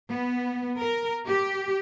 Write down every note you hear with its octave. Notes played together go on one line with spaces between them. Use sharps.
B3
A#4
G4